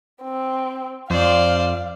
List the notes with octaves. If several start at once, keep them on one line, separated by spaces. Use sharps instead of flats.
C4
F2 C5 D5 F5